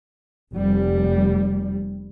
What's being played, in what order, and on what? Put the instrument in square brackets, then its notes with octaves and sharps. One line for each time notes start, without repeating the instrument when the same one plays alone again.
[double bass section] F1 G3